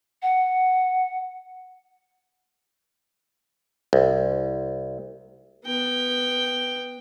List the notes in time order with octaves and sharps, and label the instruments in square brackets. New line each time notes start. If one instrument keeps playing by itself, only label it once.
[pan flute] F#5
[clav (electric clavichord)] C2
[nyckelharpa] B3 G5